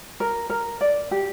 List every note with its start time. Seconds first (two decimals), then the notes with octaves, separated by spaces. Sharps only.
0.20 A#4
0.50 A#4
0.81 D5
1.11 G4